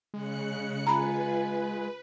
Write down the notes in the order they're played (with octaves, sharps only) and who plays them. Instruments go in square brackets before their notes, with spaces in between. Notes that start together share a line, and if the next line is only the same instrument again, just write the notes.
[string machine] C#3 F#6 C#7 [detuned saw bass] G#3
[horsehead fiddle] F4 G#5 [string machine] B4 [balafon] A#5 B5